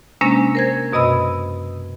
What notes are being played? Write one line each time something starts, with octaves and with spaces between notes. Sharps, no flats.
C3 G#3 A#3 C#4 D4 A#6
A#4 C5 G#6
F#2 B2 D#5 B5 E6